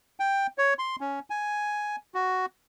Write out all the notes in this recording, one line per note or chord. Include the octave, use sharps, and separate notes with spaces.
G5
C#5
C6
C#4
G#5
F#4